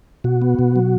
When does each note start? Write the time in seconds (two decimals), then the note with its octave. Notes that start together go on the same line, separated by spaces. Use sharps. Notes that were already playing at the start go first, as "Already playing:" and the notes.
0.24 B2 F#4
0.42 B3
0.59 B2
0.76 F#3